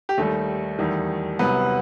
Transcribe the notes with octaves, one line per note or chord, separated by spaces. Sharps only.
G4
D#2 D#3 G3 A3 A4
E2 D#3 G3
C2 C3 F#3 B3 B4